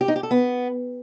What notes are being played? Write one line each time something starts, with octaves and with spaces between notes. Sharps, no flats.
G4
D#4
G4
A4
B3